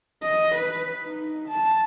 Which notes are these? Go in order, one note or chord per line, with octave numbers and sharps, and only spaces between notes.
D#5
B4
D#4
A5